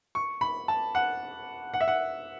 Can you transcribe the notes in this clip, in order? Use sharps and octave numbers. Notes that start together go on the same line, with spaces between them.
C#6
B5
A5
F#5
F#5
E5
F#5